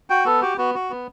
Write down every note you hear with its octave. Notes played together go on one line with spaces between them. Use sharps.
F#4 G5
B3 A4
F#4 G4
B3 F#4
F#4
B3